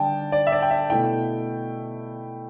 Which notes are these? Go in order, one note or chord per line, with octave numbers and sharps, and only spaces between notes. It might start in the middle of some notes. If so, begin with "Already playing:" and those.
Already playing: D3 G3 D4 G5 A5
D5
E5
D5
G5
E5
B2 A3 E4 G5